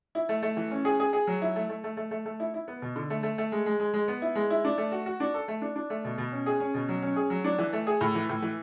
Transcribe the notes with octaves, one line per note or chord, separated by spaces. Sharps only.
E4
A3
A3
E3
C#4
G#4
G#4
G#4
F#3
E4
A3
A3
A3
A3
A3
A3
E4
E4
B3
B2
D3
A3
A3
A3
G#3
G#3
G#3
G#3
B3
E4
G#3
E4
D4
A3
F#4
F#4
D4
A4
A3
D4
D4
A3
B2
B2
C#4
G#4
C#4
B2
F#3
C#4
G#4
F#3
D4
E3
A3
G#4
A2
E3
A2
E3